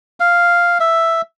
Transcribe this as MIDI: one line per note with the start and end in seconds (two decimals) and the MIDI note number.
0.20 0.78 77
0.80 1.22 76